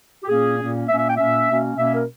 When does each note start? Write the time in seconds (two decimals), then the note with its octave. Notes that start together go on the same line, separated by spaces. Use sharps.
0.23 G4
0.28 A#2 A#3 C#4 G#4
0.59 A#2 A#3 C#4
0.88 A#2 A#3 C#4 E5
0.98 E5
1.08 G5
1.17 A#2 A#3 C#4 E5
1.47 B2 A#3 C#4
1.76 B2 A#3 C#4 E5
1.94 A#4